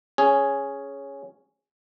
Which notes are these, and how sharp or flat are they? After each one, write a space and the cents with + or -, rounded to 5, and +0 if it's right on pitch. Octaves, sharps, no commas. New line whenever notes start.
C#4 +0 G#4 +0